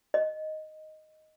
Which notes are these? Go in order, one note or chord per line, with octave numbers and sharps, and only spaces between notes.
D#5